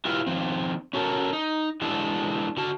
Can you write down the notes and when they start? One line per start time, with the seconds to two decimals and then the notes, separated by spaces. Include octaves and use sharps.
0.05 E4 F4 G4 B4 F5
0.27 D#3 F3 C4
0.93 C#4 F#4 A4 A#4
1.33 D#4
1.82 E3 G#3 D4 A4
2.57 D3 F#4 A5